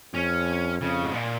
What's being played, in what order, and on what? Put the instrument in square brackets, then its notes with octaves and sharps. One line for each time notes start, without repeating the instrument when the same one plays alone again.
[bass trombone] F2 [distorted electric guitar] C#4
[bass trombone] F2 [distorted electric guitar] C#3
[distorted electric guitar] G#2
A#2